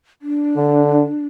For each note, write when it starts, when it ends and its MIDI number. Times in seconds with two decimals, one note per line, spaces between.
0.22 1.27 62
0.56 1.07 50